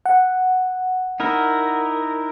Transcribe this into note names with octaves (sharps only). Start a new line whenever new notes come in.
F#5
D#4 E4 A#4